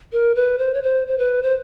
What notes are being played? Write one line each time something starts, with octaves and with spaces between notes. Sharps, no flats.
A#4
B4
C5
C#5
C5
C5
B4
C5